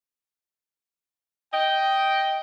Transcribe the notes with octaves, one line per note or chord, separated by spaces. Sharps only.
D#5 G5